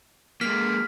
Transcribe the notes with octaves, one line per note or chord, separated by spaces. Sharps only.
G#3 A#3 F6 B6